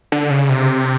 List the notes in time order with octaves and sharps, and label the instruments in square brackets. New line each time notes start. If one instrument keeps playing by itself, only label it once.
[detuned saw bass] D3
C#3
C3